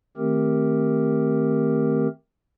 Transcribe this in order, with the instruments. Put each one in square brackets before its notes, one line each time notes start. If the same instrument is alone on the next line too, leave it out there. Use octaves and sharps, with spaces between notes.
[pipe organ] D#3 A3 C4 G4 A#4